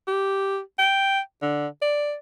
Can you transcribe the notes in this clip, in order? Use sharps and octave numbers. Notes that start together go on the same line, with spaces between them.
G4
G5
D3
D5